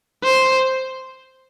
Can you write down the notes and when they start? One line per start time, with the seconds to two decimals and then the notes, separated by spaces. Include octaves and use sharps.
0.24 C5